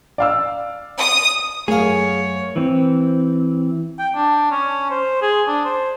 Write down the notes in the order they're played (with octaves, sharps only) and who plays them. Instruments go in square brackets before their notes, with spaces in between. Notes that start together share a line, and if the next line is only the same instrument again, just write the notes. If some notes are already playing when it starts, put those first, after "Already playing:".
[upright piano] D5 F5 E6
[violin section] D#6
[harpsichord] F#2 F5 [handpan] A3 [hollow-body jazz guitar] G#4 [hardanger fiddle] C#5
[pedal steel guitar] E3 C4
[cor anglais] G5
D4
C#4
C5
G#4
D4
C5